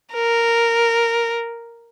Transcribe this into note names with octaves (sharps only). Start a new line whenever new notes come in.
A#4